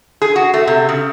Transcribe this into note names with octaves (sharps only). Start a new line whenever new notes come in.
G#4
F#4
A3
C3
C#3